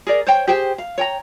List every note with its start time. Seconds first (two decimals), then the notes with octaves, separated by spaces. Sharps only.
0.07 G#4 A#4 D5
0.27 C5 C#5 G5
0.47 G4 G#4 C5 G5
0.78 F5
0.98 C#5 G5 A#5